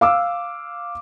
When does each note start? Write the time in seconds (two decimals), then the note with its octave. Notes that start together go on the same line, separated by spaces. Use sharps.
0.01 F5 D6 E6